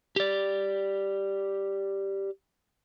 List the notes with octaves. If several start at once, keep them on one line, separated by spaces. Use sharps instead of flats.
G4 D5